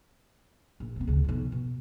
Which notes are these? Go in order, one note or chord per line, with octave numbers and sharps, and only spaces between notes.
A#1
B2 C4
D2 C#3
B1 F2
B2